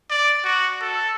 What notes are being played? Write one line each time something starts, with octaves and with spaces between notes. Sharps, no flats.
D5
F#4
A4